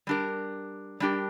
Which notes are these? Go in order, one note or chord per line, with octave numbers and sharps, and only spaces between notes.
G3 D4 G4 A#4
G3 D4 G4 A#4